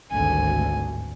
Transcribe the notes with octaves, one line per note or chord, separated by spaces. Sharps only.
G#1 D2 G2 G#5